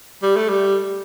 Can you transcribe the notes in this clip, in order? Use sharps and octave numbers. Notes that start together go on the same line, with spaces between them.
G3
A3
G3